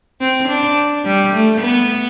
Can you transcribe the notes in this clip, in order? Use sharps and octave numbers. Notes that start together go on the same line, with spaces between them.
C4
D4
G3
A3
B3